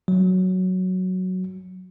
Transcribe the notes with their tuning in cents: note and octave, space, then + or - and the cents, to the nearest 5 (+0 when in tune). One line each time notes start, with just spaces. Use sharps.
F#3 +0